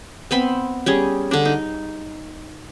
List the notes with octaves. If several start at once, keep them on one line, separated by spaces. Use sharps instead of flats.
B3 C4 B5 C6
G3 C#4 G#4
D3 D4
D#4